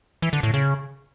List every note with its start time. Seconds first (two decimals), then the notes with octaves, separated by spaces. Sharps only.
0.22 E3
0.33 D3
0.43 A2
0.54 C#3